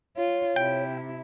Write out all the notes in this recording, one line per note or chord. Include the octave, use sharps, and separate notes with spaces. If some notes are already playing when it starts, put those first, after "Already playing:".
F4 C#5
C3 E4 G5